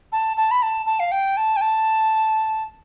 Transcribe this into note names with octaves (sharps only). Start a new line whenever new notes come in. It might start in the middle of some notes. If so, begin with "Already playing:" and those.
A5
A5
B5
A5
A5
F5
G5
A5
G5
A5